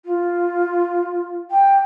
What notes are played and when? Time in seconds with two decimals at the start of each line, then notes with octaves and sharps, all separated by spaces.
0.05 F4
1.51 G5